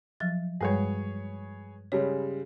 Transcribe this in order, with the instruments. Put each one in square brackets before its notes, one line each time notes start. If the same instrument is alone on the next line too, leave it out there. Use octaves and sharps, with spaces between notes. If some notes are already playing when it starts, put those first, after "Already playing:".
[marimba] F3 F#3 A6
[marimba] G2 G3 G#3 [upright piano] G#4 B4 C#5
[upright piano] C#3 G3 G#3 [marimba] C#5